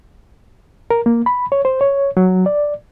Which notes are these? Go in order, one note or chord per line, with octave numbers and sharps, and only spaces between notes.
A#4
A#3
B5
C#5
C5
C#5
F#3
D5